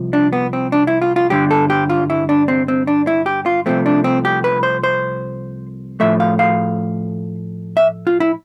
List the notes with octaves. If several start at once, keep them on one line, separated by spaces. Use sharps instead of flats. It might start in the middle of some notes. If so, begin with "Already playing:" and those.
Already playing: C2 C3 F3
D4
B3
C4
D4
E4
F4
F4
G2 D3 G3 G4
A4
G4
F4
E4
D4
C4
C4
D4
E4
G4
F4
C2 C3 F3 A3 C4
D4
C4
G4
B4
C5
C5
A2 F3 A3 E5
F5
F5
E5
F4
E4